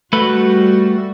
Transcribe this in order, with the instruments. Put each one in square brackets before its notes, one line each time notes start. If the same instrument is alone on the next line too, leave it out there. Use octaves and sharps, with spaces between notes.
[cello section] G3 F#4 [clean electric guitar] A3 B4